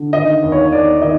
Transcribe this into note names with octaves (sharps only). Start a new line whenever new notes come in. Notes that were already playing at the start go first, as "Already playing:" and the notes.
Already playing: D3
D#3 D#5
D#2
C#5
D#2 D5
D#3 D#5